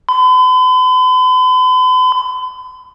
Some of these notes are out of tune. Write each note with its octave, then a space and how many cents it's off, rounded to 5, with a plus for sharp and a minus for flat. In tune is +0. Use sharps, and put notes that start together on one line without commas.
B5 +45